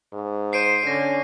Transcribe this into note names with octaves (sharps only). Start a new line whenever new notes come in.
G#2
C5 C7 D7 D#7
D3 C#4 A#6